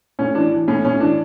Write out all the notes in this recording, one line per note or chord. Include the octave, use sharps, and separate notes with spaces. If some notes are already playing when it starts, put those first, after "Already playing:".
A2 C#4
E3 D4
E3
A2 C#4
A2 C#4
E3 D4